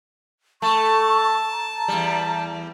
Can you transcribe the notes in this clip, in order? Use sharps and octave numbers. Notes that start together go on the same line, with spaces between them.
A3 A5 C#6
A#5
E2 G3